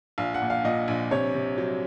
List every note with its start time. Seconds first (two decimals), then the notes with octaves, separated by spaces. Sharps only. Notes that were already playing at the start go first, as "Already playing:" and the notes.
0.18 A#1 F5
0.34 F#5
0.42 A#2
0.50 F5
0.64 A#2 D#5
0.88 A#1
1.11 C3 C#5
1.35 C3
1.58 F#3